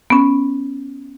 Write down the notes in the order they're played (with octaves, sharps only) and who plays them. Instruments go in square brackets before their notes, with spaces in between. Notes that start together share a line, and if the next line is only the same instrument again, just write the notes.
[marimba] B3 C#4